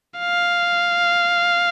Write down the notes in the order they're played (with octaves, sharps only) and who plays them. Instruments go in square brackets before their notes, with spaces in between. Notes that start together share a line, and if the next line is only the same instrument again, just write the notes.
[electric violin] F5